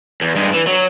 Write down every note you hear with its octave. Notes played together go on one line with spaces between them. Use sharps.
E2
G2 G#3
E3
F#3